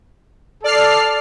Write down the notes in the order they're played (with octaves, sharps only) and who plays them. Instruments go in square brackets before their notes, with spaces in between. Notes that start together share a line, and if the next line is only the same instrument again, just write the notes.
[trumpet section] A4 [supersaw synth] D5 F6 C7